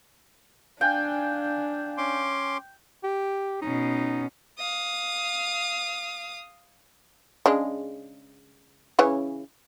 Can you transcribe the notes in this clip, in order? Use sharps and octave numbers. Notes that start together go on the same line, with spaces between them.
D4 F5 G5 G#5 F#6
C#4 C6 D6
G4
B2 C#4 D#4
F5 D#6
C#3 G#3 D4
C#3 E3 C#4